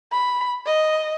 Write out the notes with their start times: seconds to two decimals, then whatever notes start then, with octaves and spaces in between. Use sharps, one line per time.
0.13 B5
0.66 D#5